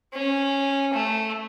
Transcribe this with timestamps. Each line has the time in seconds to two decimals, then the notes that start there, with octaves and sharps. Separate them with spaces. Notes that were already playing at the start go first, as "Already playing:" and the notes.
0.13 C#4
0.93 A3